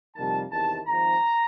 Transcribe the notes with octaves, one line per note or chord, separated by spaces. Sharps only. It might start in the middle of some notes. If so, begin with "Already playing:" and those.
F2 C3 D#3 G3 A#3 A5
E2 C3 D#3 A5
G#1 G#2 F3 A#5